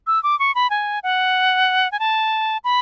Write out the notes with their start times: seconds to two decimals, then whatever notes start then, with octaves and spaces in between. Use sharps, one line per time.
0.07 E6
0.23 D6
0.39 C#6
0.55 B5
0.70 G#5
1.03 F#5
1.92 G#5
2.00 A5
2.64 B5